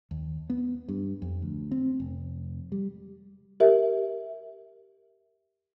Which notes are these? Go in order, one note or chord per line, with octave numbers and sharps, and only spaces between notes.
D#2
B3
G2
F2
D2
C4
F1
G3
G4 A#4 E5